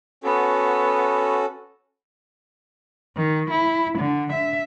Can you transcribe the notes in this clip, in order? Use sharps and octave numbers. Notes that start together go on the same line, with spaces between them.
B3 C#4 F#4 A4
D#3
E4
D3
E5